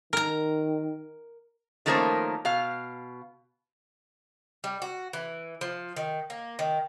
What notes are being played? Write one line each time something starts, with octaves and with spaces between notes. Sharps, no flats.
D#3 A#4 A#5
D#3 F3 A3 A#3 C#4 C5
B2 F5
G3
F#4
E3
F3
D#3
A#3
D#3